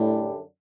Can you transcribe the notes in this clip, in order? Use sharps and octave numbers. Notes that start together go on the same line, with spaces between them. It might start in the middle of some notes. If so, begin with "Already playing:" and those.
Already playing: F#2 A2 D3 G3 D4 G4